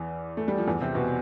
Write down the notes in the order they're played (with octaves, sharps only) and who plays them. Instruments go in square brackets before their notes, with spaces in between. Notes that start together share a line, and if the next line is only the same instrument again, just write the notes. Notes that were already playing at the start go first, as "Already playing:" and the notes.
Already playing: [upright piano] E2 E3
A3
G3
F3
E2 E3
C3 C4
B2 B3